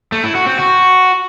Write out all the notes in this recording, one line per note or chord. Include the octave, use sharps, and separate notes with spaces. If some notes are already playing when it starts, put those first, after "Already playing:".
A3
E4
F#4
C4
F#4